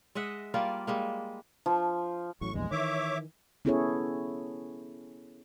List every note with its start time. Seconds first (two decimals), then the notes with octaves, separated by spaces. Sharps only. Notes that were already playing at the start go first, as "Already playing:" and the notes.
0.15 G#3 D#5 E5 F#5
0.54 G3 A#3 F4 D5
0.87 G3 G#3 A#3
1.66 F3
2.41 A1 A2 F#3 C#6
2.54 A#1 E2 G2 G#3
2.71 D#3 E3 C#5 E5 D6
3.65 B3 C#4 E4 G#4 A4 C#5